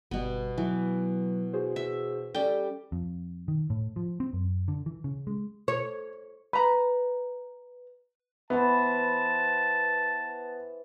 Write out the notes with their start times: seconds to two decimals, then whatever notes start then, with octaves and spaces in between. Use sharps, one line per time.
0.11 G1 B2 G3 B3
0.58 E3 F#3
1.53 F#4 G#4 C5
1.76 E5
2.35 G3 C#4 G4 A4 G5
2.92 F2
3.48 D#3
3.70 A2
3.96 F3
4.20 C4
4.33 F#2
4.68 D3
4.86 E3
5.04 C#3
5.27 G#3
5.68 C#5
6.53 B4 A#5 B5
8.50 E3 B3 C5 A5